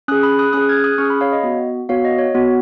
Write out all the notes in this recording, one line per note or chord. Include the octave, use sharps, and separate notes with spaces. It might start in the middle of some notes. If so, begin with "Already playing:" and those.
C#4 G#4 D#6 F#6
B5 D#6
D#6 F#6
C#4 G#4 D#6 F#6
F6 G#6
D#6 F#6
C#4 G#4 C#6 F6
B5 D#6
C#5 F5
D#5
B3 F#4
B3 F#4 C#5 F5
D#5
C#5
B3 F#4